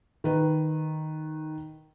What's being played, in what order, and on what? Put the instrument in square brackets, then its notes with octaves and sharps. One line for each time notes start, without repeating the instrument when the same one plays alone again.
[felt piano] D#3 B4